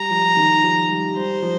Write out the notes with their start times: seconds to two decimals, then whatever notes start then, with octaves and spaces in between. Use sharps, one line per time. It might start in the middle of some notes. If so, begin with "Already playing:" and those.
Already playing: G3 A#5
0.10 F3
0.37 D#3
0.64 F3
0.90 G3
1.17 G3 C5
1.42 F3